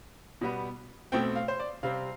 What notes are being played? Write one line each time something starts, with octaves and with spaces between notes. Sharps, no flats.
B2 G3 B3
B2 A3 C4 G5
F5
C5
D5
C3 G3 C4 F5